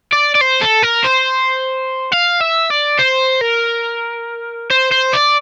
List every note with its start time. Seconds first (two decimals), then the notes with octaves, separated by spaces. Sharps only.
0.13 D5
0.35 D5
0.41 C5
0.62 A4
0.83 A#4
1.05 C5
2.12 F5
2.41 E5
2.70 D5
2.99 C5
3.41 A#4
4.71 C5
4.92 C5
5.14 D5